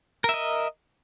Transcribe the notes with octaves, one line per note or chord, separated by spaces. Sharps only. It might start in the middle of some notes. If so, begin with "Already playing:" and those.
A#4 D#5 E5